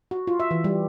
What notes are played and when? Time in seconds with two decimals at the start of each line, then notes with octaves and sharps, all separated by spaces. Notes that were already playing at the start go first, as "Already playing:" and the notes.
0.11 F#4
0.27 F4
0.40 E5
0.51 E3
0.64 G3